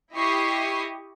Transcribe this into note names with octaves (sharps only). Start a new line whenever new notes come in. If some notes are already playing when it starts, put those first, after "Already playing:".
E4 G4 D#5 C#6 D#6 C7